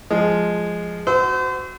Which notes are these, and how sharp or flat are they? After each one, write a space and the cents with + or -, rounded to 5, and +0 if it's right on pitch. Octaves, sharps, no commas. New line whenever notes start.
F3 +0 G#3 +0
F#4 +5 C5 -35 E6 -15